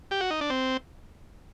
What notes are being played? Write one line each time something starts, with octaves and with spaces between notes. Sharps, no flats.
G4
F#4
D#4
D4
C4